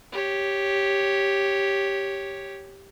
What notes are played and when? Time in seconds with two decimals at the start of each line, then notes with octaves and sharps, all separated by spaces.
0.12 G4 C#5